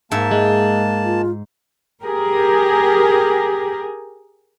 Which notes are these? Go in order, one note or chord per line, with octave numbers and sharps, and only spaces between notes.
G#2 A#3 E5 A5
G#3 G#4
F4
G4 G#4 A#4